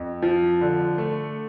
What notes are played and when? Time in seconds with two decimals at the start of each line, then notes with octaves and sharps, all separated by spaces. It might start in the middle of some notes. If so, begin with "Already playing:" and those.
Already playing: F2
0.22 F3
0.61 D3
0.98 A3